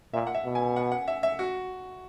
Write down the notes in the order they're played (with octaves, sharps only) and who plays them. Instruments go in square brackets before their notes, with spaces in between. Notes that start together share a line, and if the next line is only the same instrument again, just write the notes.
[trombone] A#2 [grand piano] E5
[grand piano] F#5
E5
[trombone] B2
[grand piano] G#5
F#5
F#5
E5
E5
F#4